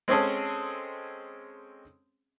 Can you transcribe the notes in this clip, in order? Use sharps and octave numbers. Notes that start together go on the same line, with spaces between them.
G#3 C4 C#4 G#4 A4